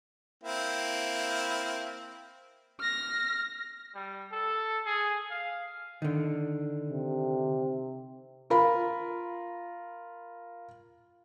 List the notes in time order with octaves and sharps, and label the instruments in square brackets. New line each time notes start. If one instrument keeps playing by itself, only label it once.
[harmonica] A#3 C4 E4
[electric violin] F6 A#6
[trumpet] G3
A4
G#4
F5
[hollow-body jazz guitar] D3 D#3
[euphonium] C3
[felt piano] F4 A#4 B5